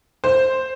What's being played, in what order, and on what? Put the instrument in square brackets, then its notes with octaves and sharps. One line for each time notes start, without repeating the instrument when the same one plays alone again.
[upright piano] C5